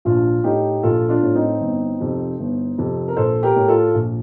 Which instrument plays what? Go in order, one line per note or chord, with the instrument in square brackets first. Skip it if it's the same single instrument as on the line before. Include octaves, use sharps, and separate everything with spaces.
[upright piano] A#1 D4 F4
A2 D#4 G4
A#1 F4 A4
D4 F4
A2
C4 D#4
G1
F2 C3
G1
F2 C3
A#4
A#1 A4 C5
G4 A#4
A2
F4 A4
A#1